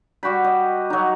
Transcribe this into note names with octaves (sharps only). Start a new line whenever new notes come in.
G3 F#4 G5 B5
D#5
F#3 D#4